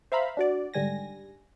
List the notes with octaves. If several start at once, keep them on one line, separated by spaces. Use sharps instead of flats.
C5 E5 F5 A#5 B5
D4 F#4 D5
G#1 G#2 D3 G3 G#5 A#6